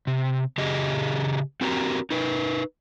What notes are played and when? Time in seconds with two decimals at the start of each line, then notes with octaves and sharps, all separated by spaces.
0.07 C3
0.58 C#3 G4 G#4 D#5
1.61 C4 F#4 G4 A#4 A#5
2.11 D#4 A#4 B4